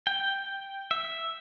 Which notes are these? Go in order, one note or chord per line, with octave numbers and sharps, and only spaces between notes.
G5
E5